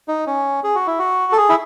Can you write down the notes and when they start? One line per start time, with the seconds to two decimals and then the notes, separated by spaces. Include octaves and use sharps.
0.08 D#4
0.27 C#4
0.64 G#4
0.75 F#4
0.87 E4
0.99 F#4
1.32 A4
1.37 G#4
1.49 E4